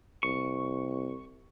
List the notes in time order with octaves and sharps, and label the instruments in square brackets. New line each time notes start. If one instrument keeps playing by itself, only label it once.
[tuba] C2 [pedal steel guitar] C#6